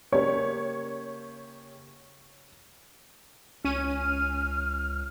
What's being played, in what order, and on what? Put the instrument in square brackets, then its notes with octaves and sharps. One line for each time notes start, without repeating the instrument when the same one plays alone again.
[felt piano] C#3 A#3 G4 [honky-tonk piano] C#5
[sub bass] C#2 [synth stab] C#4 D#7 [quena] F6